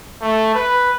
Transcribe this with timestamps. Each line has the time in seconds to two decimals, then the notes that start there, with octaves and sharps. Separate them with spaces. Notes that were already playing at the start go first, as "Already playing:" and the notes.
0.21 A3
0.55 B4